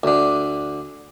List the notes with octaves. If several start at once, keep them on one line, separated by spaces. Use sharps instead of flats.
D2 D3